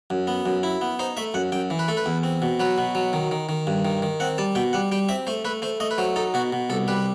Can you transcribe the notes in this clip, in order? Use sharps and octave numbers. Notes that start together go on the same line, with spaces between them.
F#2
B3
F#2
E4
B3
D#4 C5
A3 E5
F#2 F#5
F#2 G5
E3
B4
A3 A4
B4
E2
C4
B2
F#3 B4
B2
F#3
D#3
D#3
D#3
G2
D#3
D#3
C4 F#5
G3 A5
B2 G5
G3 F#5
G3 G5
C4 E5
A3 C5
A3 B4
A3 C5
A3 D#5
B4
F#3 C5
D#4 A4
B2 F#4
B2
C2 A4
G3 B4